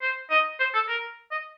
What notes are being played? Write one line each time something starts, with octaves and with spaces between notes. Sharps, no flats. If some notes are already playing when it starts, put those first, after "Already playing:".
C5
D#5
C5
A4
A#4
D#5